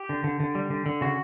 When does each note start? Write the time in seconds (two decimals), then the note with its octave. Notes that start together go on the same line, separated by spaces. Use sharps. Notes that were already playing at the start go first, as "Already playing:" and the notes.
Already playing: G4
0.09 D3
0.24 D3
0.40 D3
0.55 G3
0.70 D3
0.86 D3
1.01 C#3 F#4